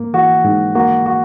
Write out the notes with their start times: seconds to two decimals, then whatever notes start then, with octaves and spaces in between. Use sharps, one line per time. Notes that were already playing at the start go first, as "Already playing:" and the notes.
Already playing: G#2 A#3
0.14 E3 F#4
0.45 G#2
0.75 A#3 F#4
1.06 F#4